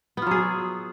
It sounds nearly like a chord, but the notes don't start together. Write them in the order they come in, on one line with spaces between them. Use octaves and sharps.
B3 F4 F#3 G#4